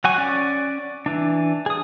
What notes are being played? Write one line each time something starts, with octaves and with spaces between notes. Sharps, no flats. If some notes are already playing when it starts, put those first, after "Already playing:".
F#3 F#5 G#5 C#6
C#4 D5
E3 D4
G#4 D#6